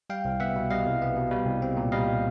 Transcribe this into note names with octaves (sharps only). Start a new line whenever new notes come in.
G3 F5 G5
C2
B3 E5 F#5
B2
G3 D#5 F5
C2
B3
B2
G3
C2
C4
A#2
G3 D#5 F5